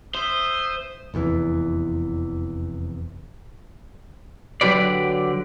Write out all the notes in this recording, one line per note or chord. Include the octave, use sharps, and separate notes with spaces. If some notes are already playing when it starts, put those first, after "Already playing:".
C5 E5 D#6
F1 E2 B2 E3
D3 F#3 F4 G4 B4 D5